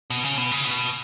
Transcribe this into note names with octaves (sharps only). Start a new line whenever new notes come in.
B2
C#3
B2
C#3
B2